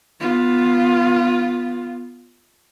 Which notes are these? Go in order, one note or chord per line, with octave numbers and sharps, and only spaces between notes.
B3 F4